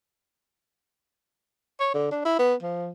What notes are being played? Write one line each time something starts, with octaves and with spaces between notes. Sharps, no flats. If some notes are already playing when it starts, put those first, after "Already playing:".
C#5
D3
D4
E4
B3
F3